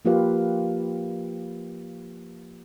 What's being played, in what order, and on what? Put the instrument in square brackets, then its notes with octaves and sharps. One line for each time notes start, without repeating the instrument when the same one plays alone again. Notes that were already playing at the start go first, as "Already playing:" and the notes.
[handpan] F3 A#3 F4 G4 B4 F5